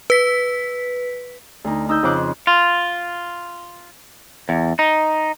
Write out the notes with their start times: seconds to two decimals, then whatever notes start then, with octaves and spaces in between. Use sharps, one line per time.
0.10 B4 B6
1.64 D2 D#4
1.89 D#4 D#6 E6 G6
2.03 F2 C#3 F3 C5 D6 F#6
2.47 F4
4.49 E2
4.79 D#4